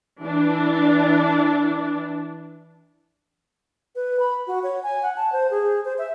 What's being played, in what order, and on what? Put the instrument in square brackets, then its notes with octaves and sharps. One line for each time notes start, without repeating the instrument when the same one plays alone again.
[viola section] E3 D4
[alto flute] B4
B5
F#4
C#5
G#5
F#5
A5
C5
G#4
C5
E5